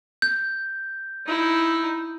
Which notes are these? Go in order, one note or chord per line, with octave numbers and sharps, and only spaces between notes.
G6
D#4 E4